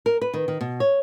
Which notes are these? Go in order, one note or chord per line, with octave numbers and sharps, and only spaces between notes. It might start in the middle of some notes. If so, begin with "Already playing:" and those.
A#4
B4
D#3
D#3
B2
C#5